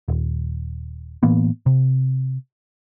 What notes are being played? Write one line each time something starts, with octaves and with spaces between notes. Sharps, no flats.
D#1
A2 E3 A#3 B3
C3